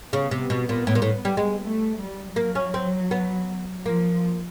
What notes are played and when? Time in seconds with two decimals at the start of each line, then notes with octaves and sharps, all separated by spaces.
0.13 C#3 B3
0.31 C3
0.50 B2
0.69 A#2
0.87 A2
0.95 A#2
1.02 A2
1.25 G3
1.37 G#3
1.62 A3
1.99 G3
2.36 F#3 A#3
2.55 C#4
2.74 C4
3.11 B3
3.86 F3 A#3